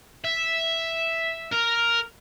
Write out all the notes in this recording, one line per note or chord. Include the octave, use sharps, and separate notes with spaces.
E5
A#4